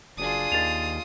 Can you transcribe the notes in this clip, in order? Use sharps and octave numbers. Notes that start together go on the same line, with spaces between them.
F#1 D4 F4 G#4 D#6
D#2 A6 F7